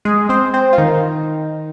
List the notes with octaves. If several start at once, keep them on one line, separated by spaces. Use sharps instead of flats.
G#3 G#4
C4 C5
C4 C5
F4
D#3 D#4